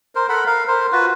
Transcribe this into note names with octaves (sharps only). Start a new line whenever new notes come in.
A#4 C5
A4 A#4 F#5 B5
A#4 F5
A#4 C5
F4 F#4 B4